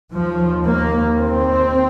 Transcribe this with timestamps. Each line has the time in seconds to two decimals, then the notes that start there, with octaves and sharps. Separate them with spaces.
0.13 D#2 F3
0.65 A#3
1.17 C4